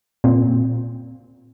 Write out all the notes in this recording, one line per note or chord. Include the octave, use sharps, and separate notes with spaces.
A#2 C4